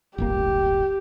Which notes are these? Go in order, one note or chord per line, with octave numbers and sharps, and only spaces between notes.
D1 G1 A#3 G4